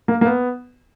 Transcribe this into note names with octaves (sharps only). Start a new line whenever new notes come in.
A#3
A#3
B3